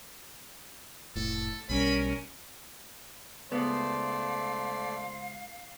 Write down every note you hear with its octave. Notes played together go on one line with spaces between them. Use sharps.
F1 A2 A4
B1 G3 C#4 A#4 B5
C#2 G#3 A3 B3 C5 D5 F5